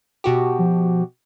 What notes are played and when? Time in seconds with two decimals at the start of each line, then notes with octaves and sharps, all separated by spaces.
0.24 B2 F#4 G4
0.59 F3